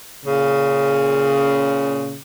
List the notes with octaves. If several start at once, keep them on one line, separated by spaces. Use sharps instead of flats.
A#2 C#3